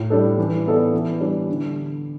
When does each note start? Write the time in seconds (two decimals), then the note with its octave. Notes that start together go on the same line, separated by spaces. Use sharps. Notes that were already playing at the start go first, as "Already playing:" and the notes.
Already playing: A2
0.10 G3 D4 A4
0.38 E3
0.66 B3 E4 A4 D5
0.93 E3
1.21 G3 D4
1.48 D3